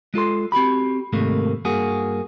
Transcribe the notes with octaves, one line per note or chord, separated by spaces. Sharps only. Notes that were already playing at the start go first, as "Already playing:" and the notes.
G#3 F4 A4 C6
C4 F#4 G4 B5
G#2 C3 D#3 A3 A#3
G2 A#3 F#4 G#4